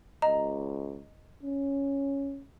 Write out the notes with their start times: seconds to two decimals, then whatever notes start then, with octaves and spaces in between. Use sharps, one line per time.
0.22 C#2 D#5 A#5
1.43 C#4